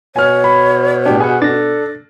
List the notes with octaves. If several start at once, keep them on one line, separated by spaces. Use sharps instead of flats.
B2 C#5 G#5 F6
B5
A2 D4 G4
G#4 B4 F#5 G#5
D4 A4 A6 A#6